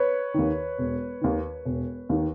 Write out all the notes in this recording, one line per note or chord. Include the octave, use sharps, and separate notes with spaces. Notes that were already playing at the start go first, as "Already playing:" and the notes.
Already playing: B4 C#5
D#2 D#3
E1
D#2 D#3
E1
D#2 D#3